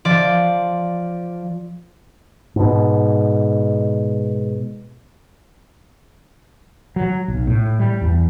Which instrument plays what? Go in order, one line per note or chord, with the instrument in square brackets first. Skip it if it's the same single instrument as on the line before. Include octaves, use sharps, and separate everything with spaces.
[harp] F3 D5
[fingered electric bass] G#2 B2
[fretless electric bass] F#3
B1
A2
G3
E2